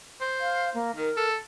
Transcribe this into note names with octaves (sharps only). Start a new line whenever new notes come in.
C5
F5
A#3
D#3 A#4
A4